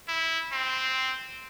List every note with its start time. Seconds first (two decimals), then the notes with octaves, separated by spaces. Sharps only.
0.08 E4
0.53 C4